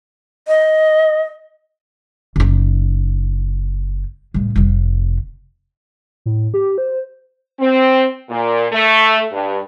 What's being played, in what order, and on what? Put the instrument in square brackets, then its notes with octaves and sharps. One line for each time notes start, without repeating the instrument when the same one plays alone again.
[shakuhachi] D#5
[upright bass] F#1 D#4
C#2 A2
F1 C3
[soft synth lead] A2
G4
C5
[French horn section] C4
A#2
A3
G2